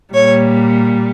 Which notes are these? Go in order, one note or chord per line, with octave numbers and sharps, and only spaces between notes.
A#2 G3 C#5